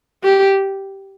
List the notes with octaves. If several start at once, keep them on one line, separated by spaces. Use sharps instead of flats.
G4